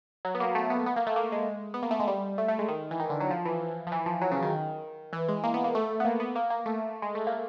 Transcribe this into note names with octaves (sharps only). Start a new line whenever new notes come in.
F#3
B3
A#3
A3
B3
B3
A#3
A3
A#3
G#3
B3
A#3
A3
G#3
G3
A3
A3
G#3
D#3
E3
D#3
D3
F#3
F3
E3
F3
E3
F3
F#3
C#3
D#3
E3
G#3
A#3
B3
A#3
A3
B3
A#3
B3
A#3
A#3
A3
G#3
A3
A#3